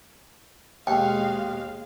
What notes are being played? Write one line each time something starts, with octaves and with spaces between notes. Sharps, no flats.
D#2 B2 G#3 F5 G5